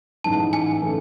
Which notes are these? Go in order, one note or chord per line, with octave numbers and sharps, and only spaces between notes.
A1 G#2 E3 G#3 D#4 A5
G#5
C#3 E3 A3